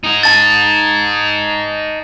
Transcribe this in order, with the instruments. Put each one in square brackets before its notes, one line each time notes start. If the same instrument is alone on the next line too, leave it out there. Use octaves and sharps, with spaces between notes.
[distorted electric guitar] D#4 G#4
[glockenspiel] A5 A6